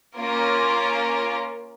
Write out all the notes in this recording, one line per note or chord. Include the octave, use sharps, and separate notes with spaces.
A#3 C#4 F4 A#4